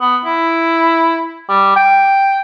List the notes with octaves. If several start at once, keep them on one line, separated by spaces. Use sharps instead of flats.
B3
E4
G3
G5